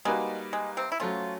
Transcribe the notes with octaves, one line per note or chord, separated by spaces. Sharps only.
G3 G#3 A#3 D#4 F#4 B4
G#3
C3 C4
E4
F3 F#3 A3 C#4 F4